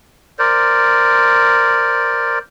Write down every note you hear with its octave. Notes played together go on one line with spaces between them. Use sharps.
A#4 C5 D5